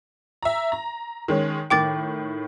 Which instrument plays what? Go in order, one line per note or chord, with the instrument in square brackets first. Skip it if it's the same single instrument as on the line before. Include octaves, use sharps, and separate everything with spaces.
[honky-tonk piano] E5 A#5
A#5
D#3 G#3 C#4
[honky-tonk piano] A2 D#3 [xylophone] G5 D6 A6